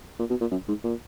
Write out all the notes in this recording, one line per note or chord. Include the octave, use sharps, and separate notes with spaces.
A#2
B2
A#2
F#2
G#2
A#2